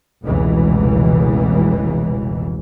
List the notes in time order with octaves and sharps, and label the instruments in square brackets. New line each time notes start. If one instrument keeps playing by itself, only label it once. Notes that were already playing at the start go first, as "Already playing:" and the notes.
[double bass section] F1 C#2 B2 E3